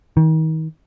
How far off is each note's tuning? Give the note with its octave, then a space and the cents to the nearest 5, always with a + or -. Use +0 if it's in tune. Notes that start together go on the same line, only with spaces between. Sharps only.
D#3 +35